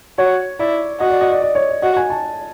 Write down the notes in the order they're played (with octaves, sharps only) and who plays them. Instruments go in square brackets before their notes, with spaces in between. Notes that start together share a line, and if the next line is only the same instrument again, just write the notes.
[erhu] F#4 [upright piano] C#5
[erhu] E4 [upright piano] D5
[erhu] F#4 [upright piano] D#5
[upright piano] D5
D#5
D5
D5
C#5
D5
[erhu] F#4 [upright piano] D#5
[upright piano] G#5
A5